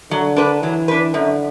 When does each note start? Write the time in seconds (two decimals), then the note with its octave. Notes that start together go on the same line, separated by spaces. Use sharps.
0.11 D3 F#3
0.36 D4 B4
0.62 E3 F#3
0.88 D4 B4
1.14 F#2 D3